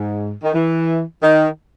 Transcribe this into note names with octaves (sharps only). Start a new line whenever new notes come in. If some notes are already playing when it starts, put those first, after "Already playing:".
Already playing: G#2
D#3
E3
D#3